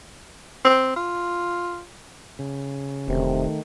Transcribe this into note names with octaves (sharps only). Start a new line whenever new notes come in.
C4
F4
C#3
E1 C3 D#3 A3